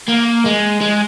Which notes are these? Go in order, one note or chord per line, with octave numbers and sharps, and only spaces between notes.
A#3
G#3
G#3